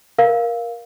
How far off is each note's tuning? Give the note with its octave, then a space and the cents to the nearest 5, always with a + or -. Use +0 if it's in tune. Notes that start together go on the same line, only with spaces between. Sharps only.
A#4 +15 F5 +0